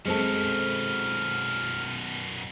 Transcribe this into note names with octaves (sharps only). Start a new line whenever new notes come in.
F#2 B2 G#3 C4 A4 F6